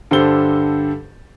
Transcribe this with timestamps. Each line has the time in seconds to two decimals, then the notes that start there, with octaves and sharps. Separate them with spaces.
0.11 G2 D3 G4 A4 C5 G7